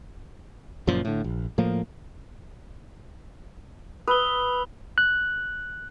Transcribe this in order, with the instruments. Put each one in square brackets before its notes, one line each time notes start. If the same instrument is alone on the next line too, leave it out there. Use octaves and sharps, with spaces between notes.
[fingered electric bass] F#1 F#2 A#2 F3
A2 D3
A#1
A2 F3 A#3
[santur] B4 [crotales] D#6 E6 G7
[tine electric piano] F#6